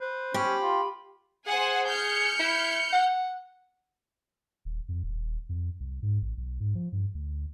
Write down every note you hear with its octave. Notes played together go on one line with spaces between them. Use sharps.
B4 C5
C#4 G4 B5
F4
G#4 C5 F#5 G#5
F6 G6 C#7
E4
F#5
D#1
F2
D#1
F2
C2
G#2
A1
B1
G#2
F3
G2
D2